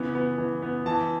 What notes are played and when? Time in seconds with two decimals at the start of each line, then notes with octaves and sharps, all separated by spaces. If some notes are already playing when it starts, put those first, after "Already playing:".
Already playing: C#3 E3 B3
0.15 B3
0.38 E3
0.62 B3
0.86 E3 A5